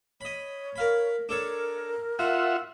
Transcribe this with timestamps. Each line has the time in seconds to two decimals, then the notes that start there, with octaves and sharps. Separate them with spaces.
0.21 C#5 D#5 B5
0.76 A#4 F5 B5
1.29 D4 A4 A#4 C#5
2.19 F4 F#4 E5 F#5